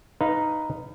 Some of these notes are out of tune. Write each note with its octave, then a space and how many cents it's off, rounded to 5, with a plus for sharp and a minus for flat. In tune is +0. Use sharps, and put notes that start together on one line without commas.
D#4 +0 B4 +15 F5 -15